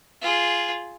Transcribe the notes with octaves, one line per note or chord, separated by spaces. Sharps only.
F4 G#4